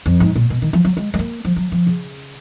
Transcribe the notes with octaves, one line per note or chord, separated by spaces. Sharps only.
F2
G#2
A#2
B2
D#3
F3
F#3
G#3
G#3
A#3
F3
F#3
F3
C#3